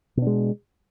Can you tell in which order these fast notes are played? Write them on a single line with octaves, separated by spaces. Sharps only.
B2 D4 G#3